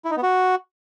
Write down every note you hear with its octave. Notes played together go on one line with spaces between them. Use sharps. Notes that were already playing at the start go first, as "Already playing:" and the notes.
E4
D#4
B3
F#4